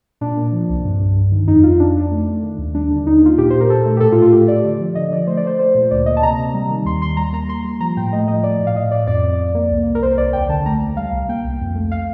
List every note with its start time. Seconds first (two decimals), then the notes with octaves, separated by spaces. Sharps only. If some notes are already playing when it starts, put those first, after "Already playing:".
0.21 A#2 D4
0.37 A#3
0.52 F3
0.70 C2
0.85 G2
1.01 G2
1.16 G2
1.32 D#3
1.48 F2 D#4
1.63 F2 F4
1.80 F2 D4
1.96 F2 D4
2.11 A3
2.26 A3
2.43 D#3
2.58 D#2
2.74 G3 D4
2.90 D3
3.06 D#2 D#4
3.22 A#3 F4
3.37 A#2 G4
3.50 A#2 C5
3.61 A#4
3.69 A#2 A4
3.85 A3
3.97 G4
4.00 A2 A4
4.12 F4
4.17 A3
4.22 F4
4.32 A3 G4
4.48 A3 D5
4.64 D3 D5
4.80 F3
4.95 D3 D#5
5.11 F3 D5
5.27 A3 C5
5.37 D5
5.44 A3 C5
5.59 A3 C5
5.75 A#2
5.91 D2 D5
6.06 A#3 D#5
6.17 A5
6.22 C3 A#5
6.39 C3
6.54 G3
6.70 D#3
6.85 D#2 C6
7.01 D#2 C6
7.17 G3 A#5
7.33 A#3 A#5
7.48 A#3 C6
7.64 G3
7.80 F3 A#5
7.97 A2 G5
8.12 A3 D#5
8.28 F3 D#5
8.43 A3 D5
8.60 A2
8.67 F5
8.75 A2 D#5
8.91 A2 D5
9.07 F2 D5
9.23 F2
9.39 F2
9.55 A#3
9.70 C2
9.87 C2
9.95 A#4
10.02 C2 C5
10.18 C2 D5
10.33 D#2 G5
10.49 D3 A5
10.66 A3 A#5
10.81 D#2
10.97 G3 F5
11.13 C2
11.29 A#3 G5
11.44 C2
11.61 F2
11.75 A3
11.91 F5